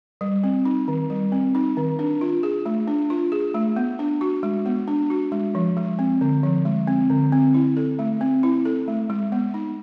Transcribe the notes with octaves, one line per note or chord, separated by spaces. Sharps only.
G3
C4
D#4
D#3
G3
C4
D#4
D#3
D4
F4
G#4
A3
D4
F4
G#4
A3
B3
D4
F#4
G#3
B3
D4
F#4
G#3
F3
G#3
C4
D3
F3
G#3
C4
D3
C4
E4
A4
A3
C4
E4
A4
A3
G#3
B3
D#4